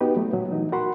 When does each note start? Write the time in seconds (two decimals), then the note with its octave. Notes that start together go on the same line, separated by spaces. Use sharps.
0.01 B3 D#4 F#4 G4 B4
0.17 F#3 A3
0.33 A#2 F#3
0.51 E3 D#4
0.72 F#4 A#4 F#5 B5 C6